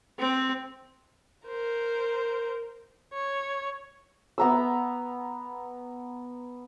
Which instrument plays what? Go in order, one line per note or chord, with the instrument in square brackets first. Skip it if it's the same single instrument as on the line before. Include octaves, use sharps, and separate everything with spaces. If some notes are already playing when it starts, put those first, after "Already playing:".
[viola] C4
[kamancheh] A#4 C5
C#5
[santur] B3 A#5 E6